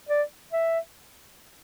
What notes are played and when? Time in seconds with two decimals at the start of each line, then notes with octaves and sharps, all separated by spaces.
0.09 D5
0.53 E5